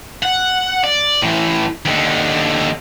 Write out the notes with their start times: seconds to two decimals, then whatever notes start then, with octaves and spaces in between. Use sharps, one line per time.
0.22 F#5
0.84 D5
1.22 A2 E3
1.85 D#2 D3